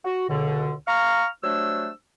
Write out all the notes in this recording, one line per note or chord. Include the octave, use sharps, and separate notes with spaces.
F#4
C#2 B2 D3
F5 A#5 C#6 F6
F#3 G3 A3 D4 C5 E6